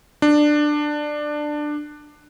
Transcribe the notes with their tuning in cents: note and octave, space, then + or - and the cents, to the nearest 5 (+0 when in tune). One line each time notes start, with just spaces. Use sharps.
D4 +15